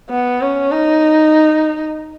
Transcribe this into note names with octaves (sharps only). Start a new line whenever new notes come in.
B3
C#4
D#4